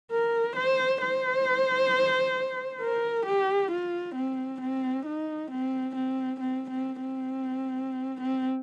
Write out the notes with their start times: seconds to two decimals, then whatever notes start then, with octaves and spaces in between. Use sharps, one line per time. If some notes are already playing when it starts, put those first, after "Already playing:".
0.12 A#4
0.56 C5
1.02 C5
2.81 A#4
3.26 G4
3.72 F4
4.16 C4
4.61 C4
5.06 D#4
5.51 C4
5.96 C4
6.40 C4
6.70 C4
7.01 C4
8.21 C4